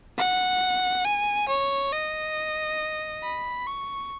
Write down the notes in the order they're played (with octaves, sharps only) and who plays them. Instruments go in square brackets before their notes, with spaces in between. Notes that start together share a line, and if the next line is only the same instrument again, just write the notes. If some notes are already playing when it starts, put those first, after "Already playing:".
[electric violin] F#5
G#5
C#5
D#5
B5
C#6